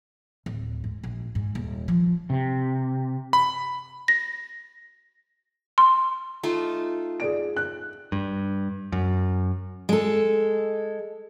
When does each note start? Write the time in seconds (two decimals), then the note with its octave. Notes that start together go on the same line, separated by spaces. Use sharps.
0.46 D1
0.84 G#2
1.04 A#1
1.35 G#2
1.55 D#1
1.88 F3
2.30 C3
3.33 B5
4.08 A#6
5.78 C6
6.43 A3 D#4 F4
7.20 G#4 D5 D7
7.57 F#6
8.12 G2
8.92 F#2
9.89 G#3 A4